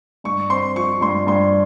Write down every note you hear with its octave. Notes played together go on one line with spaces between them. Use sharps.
G2 C#6
C4 C6
F3 C#6
G2 C6
G2 C6